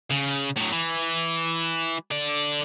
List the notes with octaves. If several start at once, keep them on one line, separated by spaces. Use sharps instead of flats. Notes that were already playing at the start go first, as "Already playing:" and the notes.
C#3
A2 F#3
E3
D3 D5